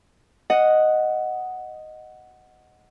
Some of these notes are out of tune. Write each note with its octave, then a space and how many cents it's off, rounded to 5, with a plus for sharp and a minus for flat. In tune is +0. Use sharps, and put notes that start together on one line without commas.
D#5 +0 F#5 +0